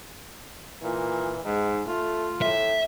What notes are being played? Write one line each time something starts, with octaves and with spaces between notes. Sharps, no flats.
A#2 E3
G#2 D#4
A3 F4
A2 E5